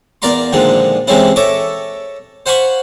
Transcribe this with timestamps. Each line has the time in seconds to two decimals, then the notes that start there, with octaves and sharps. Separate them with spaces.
0.22 E2 A#4 D5 F5 A#5 C6
0.53 A#2 D3 D#3 F3 G#3
1.07 C3 E3 G#3 C4 C#4 E4
1.36 A4 C#5 D#5 E5 D6
2.46 C5 F5 F#5 G#5 B5 C#6